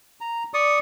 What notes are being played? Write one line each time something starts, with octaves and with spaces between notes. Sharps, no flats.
A#5
D5 C#6 D#6